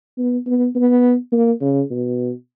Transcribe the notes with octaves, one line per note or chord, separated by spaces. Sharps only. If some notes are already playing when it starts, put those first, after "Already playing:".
B3
B3
B3
A#3
C#3
B2